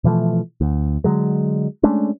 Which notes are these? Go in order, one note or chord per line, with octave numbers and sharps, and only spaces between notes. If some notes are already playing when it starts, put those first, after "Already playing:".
B2 E3 F3 A3
D2
D3 F#3 G#3
G#3 A3 C#4 D4